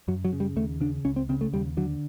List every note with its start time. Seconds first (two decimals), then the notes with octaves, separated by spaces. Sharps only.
0.08 F#2 F#3
0.25 F#3
0.33 C#3
0.40 G3
0.56 D#2 A3
0.80 C#3 D4
1.05 C#2 C#4
1.16 C4
1.29 C#3 C4
1.41 A3
1.53 D#2 G3
1.77 D3 F#3